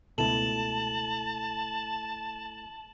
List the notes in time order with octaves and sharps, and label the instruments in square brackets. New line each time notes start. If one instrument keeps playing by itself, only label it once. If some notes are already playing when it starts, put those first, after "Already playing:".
[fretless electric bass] C#2 B2 [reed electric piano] A3 E4 A4 [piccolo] A5 [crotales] E7 F#7